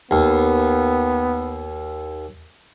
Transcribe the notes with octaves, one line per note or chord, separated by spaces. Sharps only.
D#2 B3